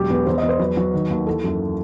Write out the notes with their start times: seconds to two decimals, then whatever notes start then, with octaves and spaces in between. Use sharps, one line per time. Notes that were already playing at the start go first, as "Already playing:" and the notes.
Already playing: E1 F#3 G4
0.10 E2 B4
0.26 E2 C5
0.38 D#5
0.43 E2
0.49 C5
0.59 F#3 B4
0.77 F#3
0.93 D#3
1.10 D#2
1.26 E3 A4
1.44 F#2